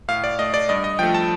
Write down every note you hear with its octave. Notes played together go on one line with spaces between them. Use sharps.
A2 F5
D5
A3 D#5
D5
G2 D#5
D#5
F3 A3 G5
A5